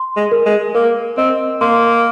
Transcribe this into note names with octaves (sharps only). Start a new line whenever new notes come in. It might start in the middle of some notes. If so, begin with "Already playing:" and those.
Already playing: C6
G#3
A#4
G#3
A#3 A#4
C4 D#5
A#3 C6